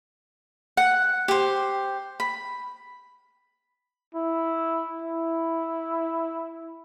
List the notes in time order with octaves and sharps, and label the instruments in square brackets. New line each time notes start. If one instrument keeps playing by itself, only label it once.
[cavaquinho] F#5
G4 C5
B5
[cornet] E4
E4